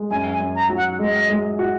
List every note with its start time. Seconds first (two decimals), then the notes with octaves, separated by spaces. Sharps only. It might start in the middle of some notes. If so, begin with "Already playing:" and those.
Already playing: G#3
0.11 F#2 G#5
0.33 G#5
0.40 F#2
0.56 A#5
0.69 F#3
0.77 F#5
0.99 G#3 D#5
1.30 G#3
1.59 F#4